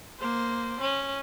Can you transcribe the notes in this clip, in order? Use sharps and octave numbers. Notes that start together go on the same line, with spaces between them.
A#3 C5
C#4